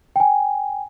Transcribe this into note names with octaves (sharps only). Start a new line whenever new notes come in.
G5 G#5